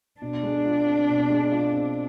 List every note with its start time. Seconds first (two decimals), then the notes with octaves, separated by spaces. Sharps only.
0.21 B2 D4
0.43 G#3
0.65 F4
0.87 C4
1.09 B2
1.30 G#3
1.52 F4
1.74 C4